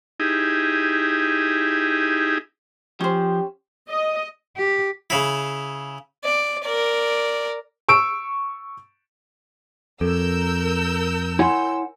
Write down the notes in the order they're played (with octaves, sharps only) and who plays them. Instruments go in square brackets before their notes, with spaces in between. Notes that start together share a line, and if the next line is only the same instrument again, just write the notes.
[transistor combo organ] D#4 E4 G4 G#4
[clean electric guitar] F3 [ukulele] C#4 C5 [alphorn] G4
[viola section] D#5
[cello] G4
[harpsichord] C#3 E4
[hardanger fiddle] D5
A#4 D5
[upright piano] C#6 E6 D7
[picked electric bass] F2 [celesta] A4 [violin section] A#4 E6 G6
[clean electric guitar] E4 C#5 F#5 [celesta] G#5 C6